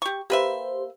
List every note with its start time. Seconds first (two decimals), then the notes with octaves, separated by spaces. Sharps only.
0.02 G4 C#6
0.30 A#3 G4 B4 C5 E5